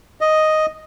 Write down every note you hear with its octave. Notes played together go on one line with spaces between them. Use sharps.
D#5